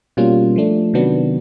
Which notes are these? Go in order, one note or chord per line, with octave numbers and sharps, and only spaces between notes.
B2 G3 A#3 C#4 F4
F3 A3 D4
C3 D#3 F#3 B3 D4